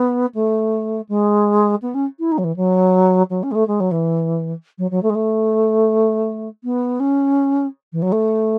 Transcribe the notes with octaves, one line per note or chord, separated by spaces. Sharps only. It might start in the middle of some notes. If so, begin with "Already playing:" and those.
Already playing: B3
A3
G#3
B3
C#4
E4
D#4
F#3
E3
F#3
F#3
C#4
G#3
A3
G#3
F#3
E3
F#3
F#3
A3
G#3
A3
B3
C#4
E3
F#3
A3